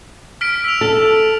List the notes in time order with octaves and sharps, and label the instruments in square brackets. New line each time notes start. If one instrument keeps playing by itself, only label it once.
[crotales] F6 B6 D7
E6 F7
[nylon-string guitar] A4